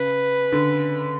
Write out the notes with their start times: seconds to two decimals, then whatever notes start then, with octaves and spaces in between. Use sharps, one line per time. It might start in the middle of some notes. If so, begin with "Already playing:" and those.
Already playing: C#3 B4
0.52 D3